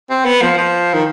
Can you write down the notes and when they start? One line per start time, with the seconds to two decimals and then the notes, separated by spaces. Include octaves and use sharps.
0.10 C4
0.25 B3
0.42 F3
0.57 F3
0.93 D#3